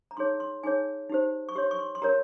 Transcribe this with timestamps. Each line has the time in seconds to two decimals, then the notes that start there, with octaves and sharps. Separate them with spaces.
0.11 A#5
0.17 D#4 G#4 C#5 C6
0.40 C6
0.63 D#4 G#4 C#5 G#5
1.10 D#4 G4 C5
1.49 C#6
1.56 G4 C#5 C6
1.71 C#6
1.79 C6
1.95 C6
2.02 G4 A#4 C#5 A#5